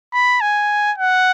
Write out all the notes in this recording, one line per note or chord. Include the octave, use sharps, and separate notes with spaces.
B5
G#5
F#5